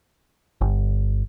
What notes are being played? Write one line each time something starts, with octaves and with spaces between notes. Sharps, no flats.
G1